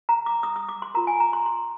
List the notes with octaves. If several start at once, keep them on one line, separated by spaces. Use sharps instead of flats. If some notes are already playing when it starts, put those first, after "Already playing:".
A#5
D6
D#6
D#6
D6
C6
F4 A#4 A#5
G#5
A#5
C6
C6